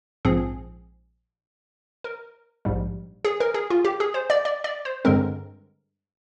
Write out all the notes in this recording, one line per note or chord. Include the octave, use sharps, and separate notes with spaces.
A#1 G#2 F3 C4 G#4
A#4
A#1 G#2 G3
G#4
A#4
G#4
F4
G4
G#4
C5
D5
D5
D5
C5
G2 D3 G#3 C4 A#4